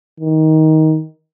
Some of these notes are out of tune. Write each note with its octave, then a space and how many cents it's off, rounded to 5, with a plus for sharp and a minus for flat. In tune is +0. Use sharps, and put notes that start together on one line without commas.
D#3 +15